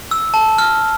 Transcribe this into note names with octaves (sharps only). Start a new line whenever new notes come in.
E6
A5
F6